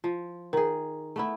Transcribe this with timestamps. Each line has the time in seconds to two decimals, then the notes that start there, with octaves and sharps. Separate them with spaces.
0.04 F3
0.53 D#3 G#4 A#4
1.16 A3 B3 E4